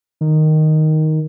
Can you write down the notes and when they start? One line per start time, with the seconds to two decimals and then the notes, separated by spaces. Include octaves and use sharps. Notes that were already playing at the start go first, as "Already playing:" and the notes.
0.21 D#3